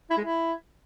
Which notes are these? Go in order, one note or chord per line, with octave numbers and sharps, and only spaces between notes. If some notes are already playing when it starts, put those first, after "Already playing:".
E4
G#3
E4